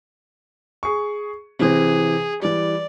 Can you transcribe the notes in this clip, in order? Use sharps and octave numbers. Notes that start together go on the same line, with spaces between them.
G#4 C#6
C3 E3 C4 G#4
E3 G3 D5